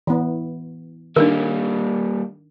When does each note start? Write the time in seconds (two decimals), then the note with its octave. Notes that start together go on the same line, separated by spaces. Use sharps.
0.07 E3 B3
1.16 D#3 G3 A#3 D4 A#4